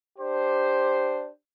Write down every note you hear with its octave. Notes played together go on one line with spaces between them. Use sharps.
D4 G4 C5